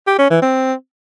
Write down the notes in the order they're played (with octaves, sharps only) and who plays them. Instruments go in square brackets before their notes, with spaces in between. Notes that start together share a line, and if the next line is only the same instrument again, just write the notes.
[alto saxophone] G4
C#4
E3
C4